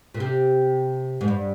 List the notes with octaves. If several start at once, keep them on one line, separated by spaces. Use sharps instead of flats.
A#2
C3
G#2
G2